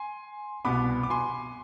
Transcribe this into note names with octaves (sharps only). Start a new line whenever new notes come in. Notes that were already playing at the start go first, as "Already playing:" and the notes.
Already playing: G#5 C6
C2 B2 B3 B5 D6
D6
G#5 C6